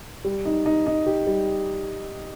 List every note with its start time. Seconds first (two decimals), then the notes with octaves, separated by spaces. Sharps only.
0.25 G3
0.45 D#4
0.66 D#4
0.86 D#4
1.06 G4
1.27 G3